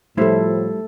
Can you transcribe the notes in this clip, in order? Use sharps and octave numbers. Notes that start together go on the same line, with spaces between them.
A2 F3 G3 A3 E4 A4 C5